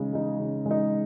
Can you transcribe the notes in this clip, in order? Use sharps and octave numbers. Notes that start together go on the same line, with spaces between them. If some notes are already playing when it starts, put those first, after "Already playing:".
Already playing: C#3 G#3 D#4
G#3 D#4
C#3
G#3 D#4